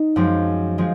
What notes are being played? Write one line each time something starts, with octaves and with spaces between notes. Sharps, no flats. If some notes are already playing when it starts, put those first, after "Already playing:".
Already playing: D#4
F#2 F3 G#3 C4
F3 G#3 C4